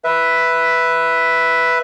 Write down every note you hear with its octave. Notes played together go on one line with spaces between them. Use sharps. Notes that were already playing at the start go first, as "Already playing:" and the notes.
B4 E5